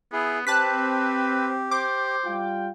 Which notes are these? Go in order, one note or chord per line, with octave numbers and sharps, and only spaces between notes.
B3 E4 G#4
C4 G4 B4 A5 F#6 B6
C5 D6
G3 F4 G5